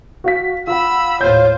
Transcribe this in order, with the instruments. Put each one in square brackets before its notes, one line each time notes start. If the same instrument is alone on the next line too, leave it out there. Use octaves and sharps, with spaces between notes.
[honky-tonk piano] F#4 F5 B6
[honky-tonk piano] F4 F#5 [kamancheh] B5 E6
[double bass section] D#2 A2 [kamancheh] F4 C5 [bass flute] C#5 [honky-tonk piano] G6